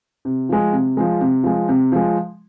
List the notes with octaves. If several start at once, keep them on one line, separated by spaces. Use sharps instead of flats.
C3
F3 G#3
C3
F3 G#3
C3
F3 G#3
C3
F3 G#3